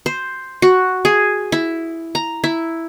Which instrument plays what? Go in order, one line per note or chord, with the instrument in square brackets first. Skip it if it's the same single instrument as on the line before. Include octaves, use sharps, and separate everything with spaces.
[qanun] C5
F#4
G#4
E4
A#5
E4